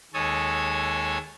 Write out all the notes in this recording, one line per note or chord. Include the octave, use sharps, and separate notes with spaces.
D#2 G#3 A4 C#5 G#5 D#6